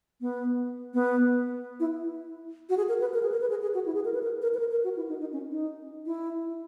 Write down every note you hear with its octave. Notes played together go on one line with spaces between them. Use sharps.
B3
B3
E4
F#4
G#4
A#4
B4
A#4
G#4
A#4
B4
G#4
G#4
F#4
E4
G#4
A#4
B4
A#4
A#4
B4
A#4
A#4
F#4
E4
D#4
D#4
C#4
D#4
E4